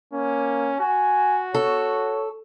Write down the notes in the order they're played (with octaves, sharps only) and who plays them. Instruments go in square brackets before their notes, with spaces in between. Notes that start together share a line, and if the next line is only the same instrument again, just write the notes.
[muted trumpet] A#3 [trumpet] C#4
[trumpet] F#4 [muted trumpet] G#5
[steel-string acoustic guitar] A4 [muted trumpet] C#5